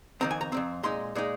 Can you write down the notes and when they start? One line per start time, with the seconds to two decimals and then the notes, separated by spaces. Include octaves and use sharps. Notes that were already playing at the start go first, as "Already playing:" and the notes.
0.21 F2 D#3 C4 A#5
0.31 G#5
0.41 A#5
0.52 F2 D#3 C4
0.83 A#2 G#3 D#4 C6
1.15 A#2 G#3 D#4